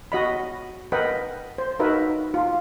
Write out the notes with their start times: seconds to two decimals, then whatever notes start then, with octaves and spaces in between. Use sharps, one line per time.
0.12 F#4 D#5 B5
0.92 A#4 B4 D#5 F#5 G5 B5
1.58 C5
1.79 D#4 F#4 A#4 B4 E5
2.34 F4